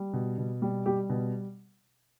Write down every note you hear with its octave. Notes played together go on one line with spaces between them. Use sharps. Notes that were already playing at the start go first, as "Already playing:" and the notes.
Already playing: G3
B2
B2
G3
G3 G4
B2